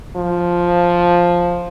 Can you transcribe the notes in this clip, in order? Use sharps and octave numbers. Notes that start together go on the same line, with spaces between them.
F3